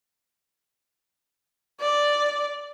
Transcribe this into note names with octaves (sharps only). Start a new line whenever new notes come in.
D5